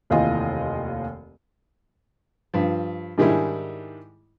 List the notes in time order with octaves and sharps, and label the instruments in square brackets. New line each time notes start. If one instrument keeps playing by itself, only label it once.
[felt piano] F1 D#2 E3 F4 D#5 G#5
[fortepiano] G2 F3
G#2 D#3 G3 G#3 D4 E4